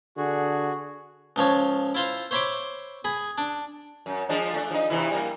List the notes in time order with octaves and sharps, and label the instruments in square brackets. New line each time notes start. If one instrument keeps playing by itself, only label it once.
[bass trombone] D3 [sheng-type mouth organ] F#4 G#4
[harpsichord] C#2 F3 C#5
E4 F4 C5
C5 C#5 E5 B5 C6 D6
G#4 G#5 B5
D4
[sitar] F#2
F3 G#3 D4
A3 D4
F3 D#4
C3 E3 E4
G3 A#3